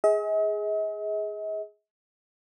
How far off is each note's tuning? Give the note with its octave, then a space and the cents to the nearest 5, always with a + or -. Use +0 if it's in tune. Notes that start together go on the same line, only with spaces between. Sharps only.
G#4 +0 D#5 +45